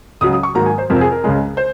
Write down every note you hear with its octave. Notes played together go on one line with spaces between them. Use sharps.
C#2 C#3 F#3 D#6
D#6
C#6
G#2 D#3 F#3 A#3 A#5
G#5
C5
F2 C3 F3 C4 A#4
G#4
A#4
C#2 C#3 G#3
C5